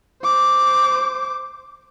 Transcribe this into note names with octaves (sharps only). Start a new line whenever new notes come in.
C5 D6